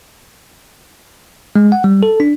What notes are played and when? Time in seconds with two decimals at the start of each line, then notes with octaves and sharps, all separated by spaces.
1.56 G#3
1.72 F#5
1.84 G3
2.03 A4
2.20 D4